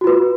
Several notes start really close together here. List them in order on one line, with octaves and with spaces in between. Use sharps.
F#4 F4 B4